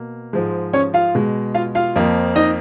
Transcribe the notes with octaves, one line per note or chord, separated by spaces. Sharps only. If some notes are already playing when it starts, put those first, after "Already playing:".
Already playing: B2 A#3
G#2 F3 G#3
C#4 C#5
F4 F5
B2 G#3
F4 F5
F4 F5
F2 F3 A#3
D#4 D#5